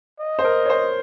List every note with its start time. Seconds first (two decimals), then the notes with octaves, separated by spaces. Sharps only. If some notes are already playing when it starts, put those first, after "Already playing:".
0.20 D#5
0.39 C5
0.45 A#4
0.65 C#5
0.70 C5